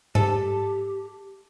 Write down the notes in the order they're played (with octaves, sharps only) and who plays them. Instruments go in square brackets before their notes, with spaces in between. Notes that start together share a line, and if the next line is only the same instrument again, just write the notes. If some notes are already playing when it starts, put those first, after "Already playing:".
[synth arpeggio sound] G#2 [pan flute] G4 [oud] A4